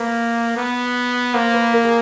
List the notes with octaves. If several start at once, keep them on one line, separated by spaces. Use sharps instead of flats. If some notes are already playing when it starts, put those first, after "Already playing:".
Already playing: A#3 B4
B3
A#3 C5
B4
A#4
G#4